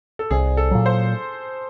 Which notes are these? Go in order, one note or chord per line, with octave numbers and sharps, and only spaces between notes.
A4
C2 G#4
A4
A#2 F#3
C5